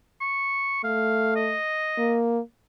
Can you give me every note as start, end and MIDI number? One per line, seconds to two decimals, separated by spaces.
0.21 0.80 85
0.84 1.56 57
0.84 1.35 77
1.36 2.16 75
1.98 2.39 58